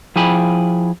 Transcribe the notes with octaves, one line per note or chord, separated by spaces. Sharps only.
F3 E4 G#4 G5 G#5 B5